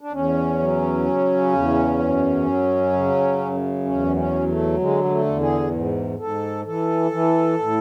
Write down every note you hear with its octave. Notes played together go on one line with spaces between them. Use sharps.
D4
E2 C#4
F#3
C#3
E2
F#2
F#3
C#3
F#2
E2 C#4
C#4
F#3
A3
D3 G#3
G#3
A3
E2
G#4
G#2
G#2 A4
E3 A4
E3
A2